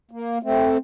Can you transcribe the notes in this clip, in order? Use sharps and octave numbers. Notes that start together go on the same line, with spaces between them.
A#3
A3 C4